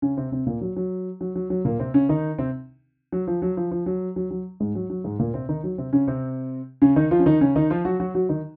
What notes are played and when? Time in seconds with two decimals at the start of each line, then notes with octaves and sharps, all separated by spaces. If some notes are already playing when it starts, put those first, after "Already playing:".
0.02 C#3 C#4
0.17 C3 C4
0.32 C3 C4
0.46 A#2 A#3
0.61 F#3
0.76 F#3
1.21 F#3
1.36 F#3
1.50 F#3
1.65 A#2 A#3
1.80 C3 C4
1.94 C#3 C#4
2.09 D#3 D#4
2.39 C3 C4
3.12 F#3
3.27 F3
3.42 F#3
3.57 F3
3.71 F3
3.86 F#3
4.16 F#3
4.31 F#3
4.60 G#2 G#3
4.75 F#3
4.90 F#3
5.04 G#2 G#3
5.19 A#2 A#3
5.34 C3 C4
5.49 D#3 D#4
5.64 F#3
5.78 C3 C4
5.93 C#3 C#4
6.08 C3 C4
6.82 C#3 C#4
6.96 D#3 D#4
7.11 F3 F4
7.19 C#4
7.26 D#3 D#4
7.41 C#3 C#4
7.56 D#3 D#4
7.70 F3 F4
7.85 F#3 F#4
8.00 F#3 F#4
8.15 F#3 F#4
8.29 D#3 D#4